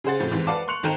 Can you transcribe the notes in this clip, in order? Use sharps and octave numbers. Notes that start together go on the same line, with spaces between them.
C#3 G#4 C5 F#5 A6
F2 A2 F3
F2 G#2 E3
B4 D5 F5 F#5 A5 D6
C6 C#6 F#6 C#7 F7
G#1 D#3 A4 G5 A#5 E7